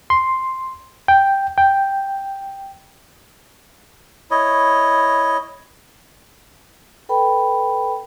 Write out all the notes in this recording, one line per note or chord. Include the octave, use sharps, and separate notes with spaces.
C6
G5
G5
E4 C#5 D#5
A4 B4 G5 B5